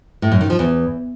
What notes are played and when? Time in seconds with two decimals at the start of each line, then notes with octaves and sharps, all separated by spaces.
0.22 A2
0.31 F#2
0.41 D#3
0.50 F3
0.59 E2